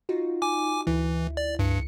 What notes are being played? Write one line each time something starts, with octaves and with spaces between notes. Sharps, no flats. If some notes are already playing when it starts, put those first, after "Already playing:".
D#4 F4 F#4
G#5 D6
D2 E3 E4
D5
C#2 G2 C#7